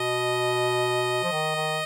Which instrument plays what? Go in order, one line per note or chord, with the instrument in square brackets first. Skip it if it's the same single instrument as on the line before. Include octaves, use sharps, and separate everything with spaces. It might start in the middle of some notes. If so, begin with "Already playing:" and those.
Already playing: [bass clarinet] B2 [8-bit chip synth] D#5
[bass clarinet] F3
D#3
D#3